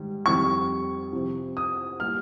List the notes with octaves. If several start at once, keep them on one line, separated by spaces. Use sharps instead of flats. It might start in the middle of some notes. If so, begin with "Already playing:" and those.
Already playing: G#2 D#3 G3
F2 D#3 G3 C#6
C3 F3 C4
D#6
G3 A#3 F6